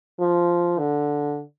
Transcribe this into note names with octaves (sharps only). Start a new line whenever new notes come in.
F3
D3